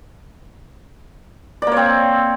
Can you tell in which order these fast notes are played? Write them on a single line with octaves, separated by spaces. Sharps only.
D5 A#3 C#5 C4